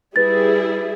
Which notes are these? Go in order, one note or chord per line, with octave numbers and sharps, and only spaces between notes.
G3 E4 G#4 B4 A6